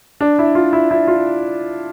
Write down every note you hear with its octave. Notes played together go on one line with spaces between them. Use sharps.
D4
E4
F4
E4
E4
F4